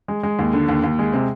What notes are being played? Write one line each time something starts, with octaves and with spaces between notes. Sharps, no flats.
G#3
G#3
D#2
D3
D#2
D#2
G#3
C3